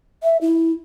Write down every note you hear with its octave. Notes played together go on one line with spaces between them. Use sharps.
E5
E4